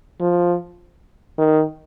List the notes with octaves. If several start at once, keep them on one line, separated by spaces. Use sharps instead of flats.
F3
D#3